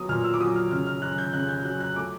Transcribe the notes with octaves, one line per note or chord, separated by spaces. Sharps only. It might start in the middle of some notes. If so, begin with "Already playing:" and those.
Already playing: F#3 B3 D#6
A#2 F6
E6
D6
F#3 D#6
F6
C#3 F6
F6
F#2 F#6
G6
C#3 F#6
G6
F#3 F#6
F#6
A3 D6